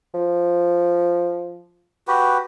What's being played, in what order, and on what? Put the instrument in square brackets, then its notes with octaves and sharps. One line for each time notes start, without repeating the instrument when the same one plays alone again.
[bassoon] F3
[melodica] F#4 G4 B4